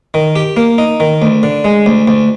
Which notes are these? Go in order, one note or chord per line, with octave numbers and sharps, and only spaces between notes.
D#3
G4
A#3
D#4
D#3
D2
D3
G#3
D2
D2